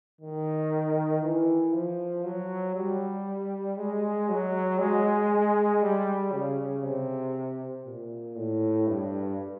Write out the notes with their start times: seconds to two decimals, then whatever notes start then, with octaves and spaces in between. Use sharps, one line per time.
0.21 D#3
1.22 E3
1.73 F3
2.24 F#3
2.75 G3
3.78 G#3
4.29 F#3
4.79 G#3
5.82 G3
6.32 C#3
6.84 C3
7.86 A#2
8.36 A2
8.87 G2